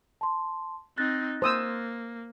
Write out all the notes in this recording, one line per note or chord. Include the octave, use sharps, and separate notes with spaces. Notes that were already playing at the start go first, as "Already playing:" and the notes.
A5 C6
C4 D#4 F#6 A6 A#6
A#3 C5 D#6 E6